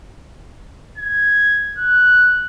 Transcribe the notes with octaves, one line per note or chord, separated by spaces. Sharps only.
G#6
F#6